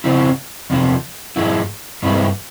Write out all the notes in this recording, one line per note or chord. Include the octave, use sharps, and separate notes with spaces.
C#3 F3 C4 E4
E2 C3 F3
G#2 F3 G#3 E4
G2 E3 G#3 C4 E4